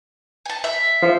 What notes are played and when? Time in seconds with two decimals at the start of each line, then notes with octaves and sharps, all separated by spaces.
0.46 G#5 A5
0.64 E5
1.02 F3